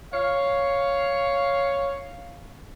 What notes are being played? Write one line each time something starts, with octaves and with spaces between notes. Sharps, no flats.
C#5 F5